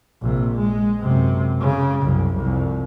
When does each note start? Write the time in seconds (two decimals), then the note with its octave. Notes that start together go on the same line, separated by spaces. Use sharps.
0.22 A#1 C3
0.55 G#3
1.01 F#2 C3
1.61 C#3
2.02 C2 F#2
2.36 C2 F2